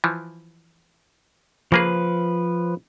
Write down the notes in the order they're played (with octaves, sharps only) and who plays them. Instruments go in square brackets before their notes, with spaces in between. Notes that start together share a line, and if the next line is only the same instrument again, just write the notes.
[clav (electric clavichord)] E3 F3
[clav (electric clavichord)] C#3 A#3 G#4 [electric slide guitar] F3 B4